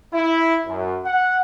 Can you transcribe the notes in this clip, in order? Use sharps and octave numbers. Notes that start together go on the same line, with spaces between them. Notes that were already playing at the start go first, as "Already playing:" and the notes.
E4
F#2
F#5